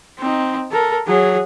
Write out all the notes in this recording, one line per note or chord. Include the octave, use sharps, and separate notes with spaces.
C4 D#4
A4 A#4
F#3 G#4